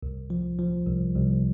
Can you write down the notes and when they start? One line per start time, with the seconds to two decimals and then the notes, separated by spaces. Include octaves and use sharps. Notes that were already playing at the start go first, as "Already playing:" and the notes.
0.03 C2
0.30 F3
0.59 F3
0.87 C2
1.15 C2